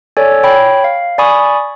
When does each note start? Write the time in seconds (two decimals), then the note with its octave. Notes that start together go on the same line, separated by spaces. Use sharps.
0.17 A4 C#5 D5 G#5
0.43 C#5 G5 B5
0.84 F5
1.18 D5 G#5 B5 C#6 D#6